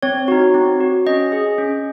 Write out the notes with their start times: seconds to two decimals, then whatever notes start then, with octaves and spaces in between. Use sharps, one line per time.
0.03 C4 C#5
0.28 D#4 F#4
0.54 C4
0.80 F#4
1.06 C#4 D#5
1.32 G#4
1.58 C#4